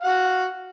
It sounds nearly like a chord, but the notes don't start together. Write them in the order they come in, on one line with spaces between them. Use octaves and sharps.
F5 F#5 F#4